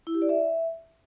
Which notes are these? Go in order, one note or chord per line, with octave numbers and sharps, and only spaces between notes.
E4
G4
D5
E5